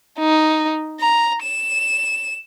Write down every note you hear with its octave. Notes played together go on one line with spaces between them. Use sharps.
D#4
A#5
E7